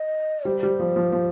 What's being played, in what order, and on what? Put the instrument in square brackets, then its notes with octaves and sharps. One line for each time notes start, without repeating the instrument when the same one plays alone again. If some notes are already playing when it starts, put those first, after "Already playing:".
Already playing: [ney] D#5
[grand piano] G3 [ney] C5
[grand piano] G3
F3
F3
F3